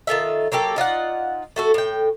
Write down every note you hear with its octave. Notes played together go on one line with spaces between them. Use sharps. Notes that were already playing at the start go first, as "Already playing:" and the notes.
D#3 F4 A4 E5
F#3 A#3 G4 A4
D#4 F4 D5 F#5
A3 F#4 A4
A2 G5